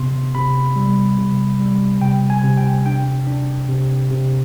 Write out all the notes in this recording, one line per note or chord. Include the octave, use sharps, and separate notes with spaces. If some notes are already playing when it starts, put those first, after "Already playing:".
Already playing: C3 B3 C6
C3 B5
G3
C3
G3
C3 G5
G#5
C3
G5
D4 G5
D4
C3
C3